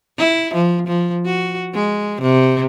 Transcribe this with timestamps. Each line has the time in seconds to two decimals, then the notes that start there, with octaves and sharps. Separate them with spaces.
0.19 E4
0.55 F3
0.87 F3
1.26 F#4
1.75 G#3
2.22 C3